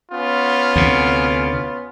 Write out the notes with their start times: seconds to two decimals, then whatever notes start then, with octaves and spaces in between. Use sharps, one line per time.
0.12 B3 C#4 F4
0.76 D2 C3